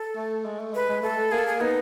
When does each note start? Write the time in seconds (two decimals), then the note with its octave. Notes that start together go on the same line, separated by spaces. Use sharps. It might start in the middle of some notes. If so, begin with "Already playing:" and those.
Already playing: A4
0.16 A3
0.45 G#3
0.60 A3
0.74 G#3 B4
0.89 G#3
1.02 A3 A4
1.32 A#3 G#4
1.38 A4
1.47 G#4
1.61 B3 D#4